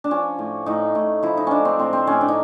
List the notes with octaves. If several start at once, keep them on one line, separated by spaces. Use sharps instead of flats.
D4
F3 C#4
A2
A2 D#4
A2
F3 E4
D#4
G#3 C#4 D4
C4
A2 C4
C4
A2 C#4
D4
D#4